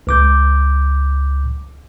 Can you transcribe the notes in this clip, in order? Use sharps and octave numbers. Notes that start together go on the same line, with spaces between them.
C#2 D6 G6